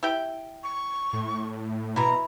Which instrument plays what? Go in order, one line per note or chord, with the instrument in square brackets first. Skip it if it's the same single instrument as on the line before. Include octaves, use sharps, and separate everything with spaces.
[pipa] E4 G4 G5
[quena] C#6
[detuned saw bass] A2
[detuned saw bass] B2 [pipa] E3 E4 [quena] A#5